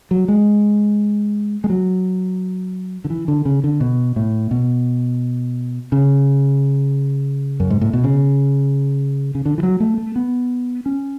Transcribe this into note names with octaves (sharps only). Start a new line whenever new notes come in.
F#3
G#3
G#3
F#3
D3
E3
D3
C#3
D3
B2
A2
B2
C#3
F#2
G#2
A2
B2
C#3
C#3
D3
E3
F#3
A3
A3
B3
C#4